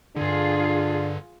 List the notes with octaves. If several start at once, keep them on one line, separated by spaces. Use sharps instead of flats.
G2 D3 D4 F4 G#4